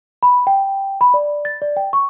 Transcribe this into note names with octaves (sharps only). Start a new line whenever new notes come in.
B5
G5
B5
D5
A6
D5
G5
C#6